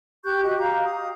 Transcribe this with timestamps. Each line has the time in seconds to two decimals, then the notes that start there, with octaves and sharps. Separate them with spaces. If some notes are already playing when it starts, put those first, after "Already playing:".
0.25 G4 C#6 F#6 G6
0.43 F#4 G4 D#5
0.59 F5 A#5
0.84 D#6